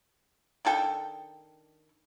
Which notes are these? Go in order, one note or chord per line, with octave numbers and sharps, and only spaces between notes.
D#3 D4 A4 G5